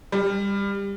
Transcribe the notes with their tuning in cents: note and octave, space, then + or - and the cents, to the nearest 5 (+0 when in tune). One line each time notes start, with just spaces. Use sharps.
G3 +25